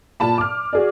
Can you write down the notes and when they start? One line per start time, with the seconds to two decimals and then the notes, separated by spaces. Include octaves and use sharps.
0.20 A#2 A5 B5
0.38 D6 F6
0.73 F#4 G#4 D5